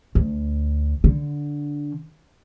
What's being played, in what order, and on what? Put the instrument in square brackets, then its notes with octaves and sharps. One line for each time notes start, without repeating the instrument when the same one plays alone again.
[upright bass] D2
D3